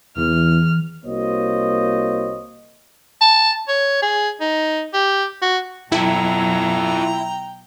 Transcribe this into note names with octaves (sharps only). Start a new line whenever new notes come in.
E2 E3 F6
C2 A#3 F#4 C5 C#5 D#5
A5
C#5
G#4
D#4
G4
F#4
B2 F#3 E4 F4 A4 G5 A#5